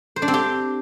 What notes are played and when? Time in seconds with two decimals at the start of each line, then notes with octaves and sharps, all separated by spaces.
0.16 C5
0.22 D4
0.28 C4
0.34 G4